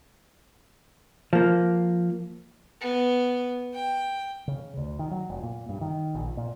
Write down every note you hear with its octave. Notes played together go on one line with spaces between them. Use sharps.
F3 A#3
B3
G5
C#3
D2
D#3
F#3
F1
A#2
G2
D#3
A#1
A#2